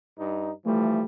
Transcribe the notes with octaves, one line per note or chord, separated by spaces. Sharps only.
G2 D#4
E3 F3 G3 A3